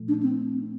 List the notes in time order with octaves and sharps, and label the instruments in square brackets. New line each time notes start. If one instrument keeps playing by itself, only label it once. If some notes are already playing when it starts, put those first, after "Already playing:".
Already playing: [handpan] A#2 F3 A3
[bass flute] D4
C4